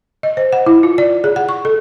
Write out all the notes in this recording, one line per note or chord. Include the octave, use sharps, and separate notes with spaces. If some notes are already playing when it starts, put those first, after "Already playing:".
D#5
C5
F#5
E4
F4
D5
G#4
F#5
C#6
A4